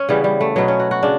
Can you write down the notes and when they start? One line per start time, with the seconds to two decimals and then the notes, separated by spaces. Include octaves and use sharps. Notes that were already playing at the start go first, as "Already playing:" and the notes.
Already playing: C#4
0.09 C#3 E3 G3 B3
0.24 G3
0.41 A3
0.56 B2 F#3 B3
0.68 C#4
0.80 F#4
0.91 F#4
1.03 C#3 D4